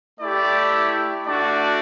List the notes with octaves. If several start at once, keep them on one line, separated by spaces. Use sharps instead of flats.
A3 E4 G4 D5
A3 D4 F#4 D5